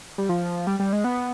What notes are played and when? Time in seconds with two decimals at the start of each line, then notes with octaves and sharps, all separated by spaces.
0.18 G3
0.29 F3
0.67 G3
0.80 G3
0.93 G#3
1.04 B3